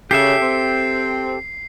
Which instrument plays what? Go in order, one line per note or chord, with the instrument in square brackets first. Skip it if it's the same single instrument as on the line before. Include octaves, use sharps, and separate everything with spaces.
[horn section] C#3 [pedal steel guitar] G4 A4 E5 [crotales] C7
[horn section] C4